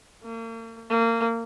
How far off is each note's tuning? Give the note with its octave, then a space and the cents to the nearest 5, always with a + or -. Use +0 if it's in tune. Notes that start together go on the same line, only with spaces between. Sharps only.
A#3 -40
A#3 -25